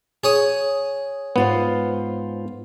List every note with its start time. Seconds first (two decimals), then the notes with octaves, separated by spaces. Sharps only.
0.24 G#4 C#5 D#6
1.36 G#2 B3 F4 C5